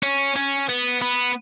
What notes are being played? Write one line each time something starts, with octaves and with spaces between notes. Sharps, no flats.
C#4
C#4
B3
B3